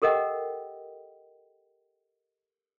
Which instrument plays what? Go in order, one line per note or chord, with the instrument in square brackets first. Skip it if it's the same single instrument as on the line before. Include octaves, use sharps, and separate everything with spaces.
[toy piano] G4 A4 A#4 D#5 F#5 G5